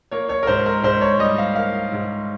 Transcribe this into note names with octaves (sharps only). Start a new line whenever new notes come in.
A#3 C#5
C#5
A#4
G#2 C5
A#4
G#2 C5
C#5
G3 D#5
F5
A#3 F5
G#2